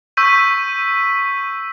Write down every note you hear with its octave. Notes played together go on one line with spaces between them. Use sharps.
C#6 E6 G6 B6 D#7